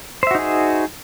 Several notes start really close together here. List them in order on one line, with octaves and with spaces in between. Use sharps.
C5 E5 F#4 D#4 G#4